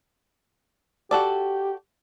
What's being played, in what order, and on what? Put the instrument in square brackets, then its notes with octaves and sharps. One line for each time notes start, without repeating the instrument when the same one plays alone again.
[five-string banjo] F#4 A4 D5 [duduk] G4